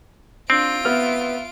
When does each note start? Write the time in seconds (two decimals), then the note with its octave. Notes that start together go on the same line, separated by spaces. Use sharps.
0.50 C4 D4 F4 D7
0.85 B3 E5 F6